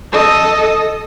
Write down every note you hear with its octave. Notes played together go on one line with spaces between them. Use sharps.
A4 D#5